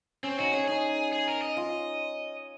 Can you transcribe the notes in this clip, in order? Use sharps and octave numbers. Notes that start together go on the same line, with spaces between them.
C4 C#4
D#4 F#4
C#4 G#4
D#4 G#4
G#4
A#4
D#5
F4